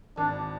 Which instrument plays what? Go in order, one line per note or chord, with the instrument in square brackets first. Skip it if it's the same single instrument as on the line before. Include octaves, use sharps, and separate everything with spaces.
[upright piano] G#1 [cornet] D4